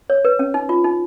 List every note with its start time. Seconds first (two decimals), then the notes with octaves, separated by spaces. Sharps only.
0.10 C#5
0.25 B4
0.39 C#4
0.54 D#4
0.69 F4
0.84 D#4